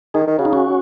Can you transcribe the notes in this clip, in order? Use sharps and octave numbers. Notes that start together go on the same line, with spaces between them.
D#3 D#4 G#4
D#3
C#3 F#4
D#4
C#4 F#4